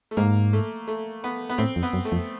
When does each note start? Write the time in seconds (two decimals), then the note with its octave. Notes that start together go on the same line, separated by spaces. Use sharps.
0.11 A3
0.17 G#2 A#3
0.53 A3
0.87 A3
1.24 B3
1.49 B3
1.58 A2 C4
1.76 F2
1.83 B3
1.93 F#2
2.05 A3
2.12 F2